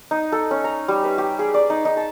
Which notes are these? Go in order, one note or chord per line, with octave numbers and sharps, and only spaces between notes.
D#4
A4
C#4
A#5
G3
B4
G4
G#4
D5
D#4
D#4
A5